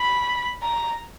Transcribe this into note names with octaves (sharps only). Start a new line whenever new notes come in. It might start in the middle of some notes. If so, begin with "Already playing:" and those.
Already playing: B5
A#5